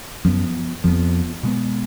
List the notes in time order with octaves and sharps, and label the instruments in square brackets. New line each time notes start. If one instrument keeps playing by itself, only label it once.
[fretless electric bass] F#2 [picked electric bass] F3 B3
[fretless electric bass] F2 [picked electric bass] F3 B3
[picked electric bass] B2 G#3 B3